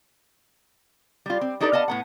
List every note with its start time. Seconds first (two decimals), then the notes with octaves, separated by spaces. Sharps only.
1.26 G3 F4
1.41 C4
1.61 D4 D#4 G4 A4 B4 D5
1.72 B3 D#5 F5 A5
1.88 A2 B3 F#5